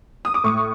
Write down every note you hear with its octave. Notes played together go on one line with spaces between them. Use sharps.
D#6
D6
A2 C#6